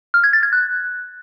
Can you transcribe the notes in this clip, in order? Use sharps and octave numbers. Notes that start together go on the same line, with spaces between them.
F6
G#6
A6
G#6
F#6